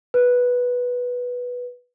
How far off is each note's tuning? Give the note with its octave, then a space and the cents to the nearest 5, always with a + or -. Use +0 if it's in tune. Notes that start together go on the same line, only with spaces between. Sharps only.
B4 -5